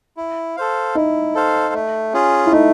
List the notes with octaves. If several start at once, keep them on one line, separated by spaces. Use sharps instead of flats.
E4
A4 C5 F5
D#4 E4
A4 C5 F5
A3
C#4 F4 G#4
E4
A3 D#4